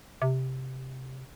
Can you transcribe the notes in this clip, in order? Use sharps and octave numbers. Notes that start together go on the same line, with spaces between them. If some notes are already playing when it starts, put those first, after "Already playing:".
C3